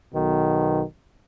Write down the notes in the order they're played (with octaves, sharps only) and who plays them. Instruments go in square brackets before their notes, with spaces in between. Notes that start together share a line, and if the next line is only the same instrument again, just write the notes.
[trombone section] B1 B2 D#3